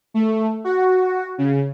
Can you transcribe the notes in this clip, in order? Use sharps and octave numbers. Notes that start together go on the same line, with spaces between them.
A3
F#4
C#3